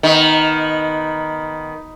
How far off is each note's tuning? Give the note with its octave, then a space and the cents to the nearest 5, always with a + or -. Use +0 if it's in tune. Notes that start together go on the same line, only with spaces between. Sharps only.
D#3 +5 B3 +0